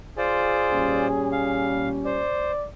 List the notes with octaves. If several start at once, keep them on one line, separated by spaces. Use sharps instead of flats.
F4 G#4 C5 D5
A#2 G3 C#4
F5
C5 D5